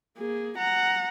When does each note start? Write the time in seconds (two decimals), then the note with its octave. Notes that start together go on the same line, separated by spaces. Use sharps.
0.18 A#3 G#4
0.58 F#5 A#5